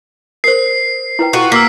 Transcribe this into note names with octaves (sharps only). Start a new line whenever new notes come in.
A#4 C5 C7
E4 B4 G5
F4 F#4 A4
A#3 E6 B6